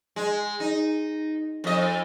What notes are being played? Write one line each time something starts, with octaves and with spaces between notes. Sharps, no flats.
G#3
D#4
F2 D#5